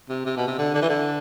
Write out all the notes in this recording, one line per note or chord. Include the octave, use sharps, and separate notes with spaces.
C3
C3
B2
C3
D3
D3
E3
D3